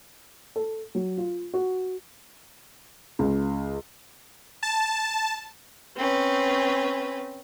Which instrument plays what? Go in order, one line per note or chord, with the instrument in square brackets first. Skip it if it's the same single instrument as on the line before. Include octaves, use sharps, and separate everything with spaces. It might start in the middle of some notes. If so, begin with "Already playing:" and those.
[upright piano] A4
F#3
F4
F#4
[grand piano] C#2
[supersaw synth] A5
[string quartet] C4 C#4 B4